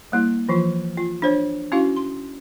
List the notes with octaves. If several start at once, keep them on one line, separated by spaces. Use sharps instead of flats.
G3 A#3 E4
E3 F3 F4
F4
D4 C5 C#5
C#4 E4 F#4 F5
C6